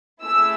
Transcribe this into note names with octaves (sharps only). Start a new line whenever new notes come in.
A3 E4 G#4 E6